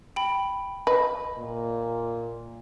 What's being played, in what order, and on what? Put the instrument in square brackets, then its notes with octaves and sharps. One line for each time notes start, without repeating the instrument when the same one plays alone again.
[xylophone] G5 B5
[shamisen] B4 [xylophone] D#5
[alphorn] A#2